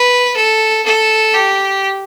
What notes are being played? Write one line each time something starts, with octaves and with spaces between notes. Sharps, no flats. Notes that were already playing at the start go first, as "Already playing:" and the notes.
Already playing: B4
A4
A4
G4